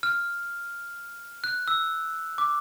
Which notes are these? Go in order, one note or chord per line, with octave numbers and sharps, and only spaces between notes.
F6
F#6
E6
D6